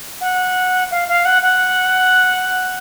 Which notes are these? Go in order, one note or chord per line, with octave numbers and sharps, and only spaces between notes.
F#5
F5
F5
F#5
F#5